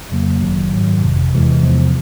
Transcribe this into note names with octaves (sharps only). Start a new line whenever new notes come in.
F2 C#3 F#3 A#3
G1 F#2 D#3 F#3
G#2 D#3 F#3
G1 F2 C3
E2 C3 E3 G#3
E2 C3 F3